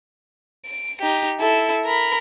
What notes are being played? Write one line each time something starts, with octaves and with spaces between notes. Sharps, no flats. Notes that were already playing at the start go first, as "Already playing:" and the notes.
D7
D#4 G4
E4 A4
A#4 B5